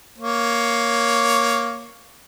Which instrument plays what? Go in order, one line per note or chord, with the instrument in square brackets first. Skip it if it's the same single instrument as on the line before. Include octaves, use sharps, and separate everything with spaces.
[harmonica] A#3 C#5